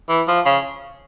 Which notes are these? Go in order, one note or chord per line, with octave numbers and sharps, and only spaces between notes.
E3
F3
C#3